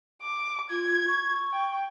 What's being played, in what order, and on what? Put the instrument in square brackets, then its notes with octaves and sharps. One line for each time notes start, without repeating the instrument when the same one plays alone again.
[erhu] D6
[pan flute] F4 [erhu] G#6
[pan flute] C#6
[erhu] G5